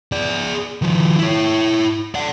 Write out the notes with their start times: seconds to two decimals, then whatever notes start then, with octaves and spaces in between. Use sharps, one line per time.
0.12 G#4 D5
0.82 D#3 F3
1.18 E4 C#5
2.15 D5 F#5